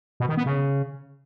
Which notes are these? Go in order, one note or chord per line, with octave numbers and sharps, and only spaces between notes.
B2
D#3
B3
C#3